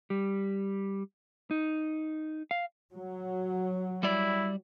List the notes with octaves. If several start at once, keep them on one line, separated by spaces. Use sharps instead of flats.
G3
D#4
F5
F#3
G3 E4 D5